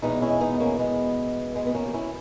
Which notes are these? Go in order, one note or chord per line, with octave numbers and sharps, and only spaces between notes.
E2 B2 G#3 B3 D#4
C#4 E4
B3 D#4
A#3 C#4
G#3 B3
G#3 B3
B3
A#3 C#4
G4
C#4 E4